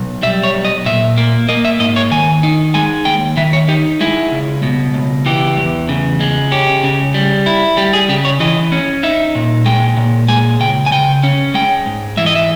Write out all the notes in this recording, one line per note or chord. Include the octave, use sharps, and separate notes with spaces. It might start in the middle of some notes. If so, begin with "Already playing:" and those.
Already playing: B1
G3 E5
C#5
B1
D#5
A#2 E5
A#3
A#3 D#5
E5
G#2 D#5
C#5
D#3 G#5
D#4
G#3 G#5
D#2 G5
D#3 E5
C#5
D#4 G4
G#3 E4
C#2
B2
C#2
E3 G4
E2
C#3
G#3
C#4 G4
C#3
G3
E4
G3 G4
G#4
C#3 G4
C#5
E3 D#5
C#4
D#4 E5
A#2
G#3 G5
A#2
G#3 G#5
C#2 G5
G#5
C#3 G5
C#4
G#3 G5
G#2
E3 E5
D#5
E5